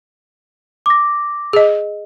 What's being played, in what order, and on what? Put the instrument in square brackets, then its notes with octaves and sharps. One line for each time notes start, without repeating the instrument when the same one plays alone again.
[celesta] D6 A#6
[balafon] G#4 D#5